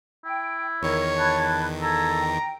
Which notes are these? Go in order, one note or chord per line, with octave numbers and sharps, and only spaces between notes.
E4 G5
E2 D#3 A#4 C#5
A5 B5 F#6 G#6
A4 A#5 G#6
G5